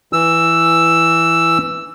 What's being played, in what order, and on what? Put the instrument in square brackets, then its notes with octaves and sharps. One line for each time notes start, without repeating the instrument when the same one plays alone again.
[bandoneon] E3 E6